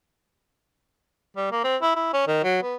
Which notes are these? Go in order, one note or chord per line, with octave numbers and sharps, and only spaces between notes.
G3
A#3
C4
E4
E4
C#4
D#3
F#3
B3